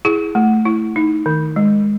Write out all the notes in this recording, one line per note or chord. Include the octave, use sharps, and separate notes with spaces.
E4 G#4
A3
E4
D#4
D#3
G#3